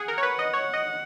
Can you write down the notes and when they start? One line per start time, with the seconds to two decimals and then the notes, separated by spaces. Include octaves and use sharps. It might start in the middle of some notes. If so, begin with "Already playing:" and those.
Already playing: G#4 F#5
0.08 A#4
0.18 C#5
0.23 B4
0.39 D#5
0.53 C#5
0.74 D#5